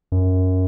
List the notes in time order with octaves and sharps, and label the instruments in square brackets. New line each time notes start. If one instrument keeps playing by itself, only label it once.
[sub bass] F#2